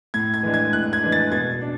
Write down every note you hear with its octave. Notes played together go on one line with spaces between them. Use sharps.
A2 G#6
G#6
E3 G#3 D4
G#6
A2 F#6
G#6
E3 G#3 D4
A6
B2 G#6
D4